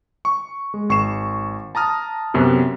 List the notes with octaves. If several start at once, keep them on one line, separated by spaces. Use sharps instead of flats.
C#6
G#3
G#1 C#6 C7 E7
A5 A#5 D#6 F6 A6
F#2 C3 B3 F#4